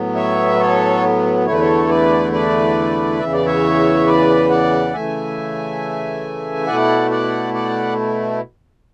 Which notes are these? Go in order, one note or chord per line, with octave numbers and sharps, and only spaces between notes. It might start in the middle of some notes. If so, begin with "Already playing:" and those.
Already playing: A2 F#3 B3
C#5 E5
A4 C#5
E2 D3 A3 E4 C#5
B4
A4 C#5
B4 D5
B4 D5
E2 C#3 E3 E5
D5
C#5 E5
B4 D5
D5 F#5
C#3 E3 A3 E5 G#5
B2 A3 E4 D5 F#5
D5 F#5
D5 F#5